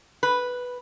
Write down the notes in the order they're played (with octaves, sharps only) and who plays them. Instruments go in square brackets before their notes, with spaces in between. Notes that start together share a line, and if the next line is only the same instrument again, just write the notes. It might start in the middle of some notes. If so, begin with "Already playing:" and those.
[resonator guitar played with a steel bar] B4